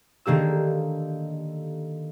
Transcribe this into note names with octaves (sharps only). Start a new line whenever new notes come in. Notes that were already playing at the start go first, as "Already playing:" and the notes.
D3 D#3 A#3 G4 E6